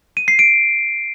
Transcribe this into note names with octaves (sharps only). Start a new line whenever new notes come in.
D#7
C7
D7